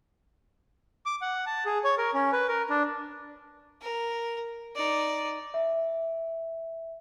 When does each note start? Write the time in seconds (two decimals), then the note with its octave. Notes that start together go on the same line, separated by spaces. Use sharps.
1.06 D6
1.22 F#5
1.46 A5
1.66 G#4
1.84 C#5
1.98 A#4
2.14 C#4
2.32 B4
2.48 A#4
2.70 D4
3.81 A#4
4.75 D#4 D5
5.54 E5